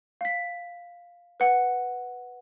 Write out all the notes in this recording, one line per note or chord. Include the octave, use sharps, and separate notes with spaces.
F5 B6
B4 F#5